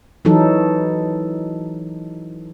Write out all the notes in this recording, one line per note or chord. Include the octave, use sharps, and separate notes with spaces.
E3 F#3 D#4 A4